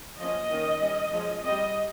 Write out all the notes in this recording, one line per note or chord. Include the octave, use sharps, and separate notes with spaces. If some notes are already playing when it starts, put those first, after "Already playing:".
F3 A#3 C#4 D#5
D#3 A#3 C#4
G3 C#4
F3 G#3 C#4
G3 C4 D#5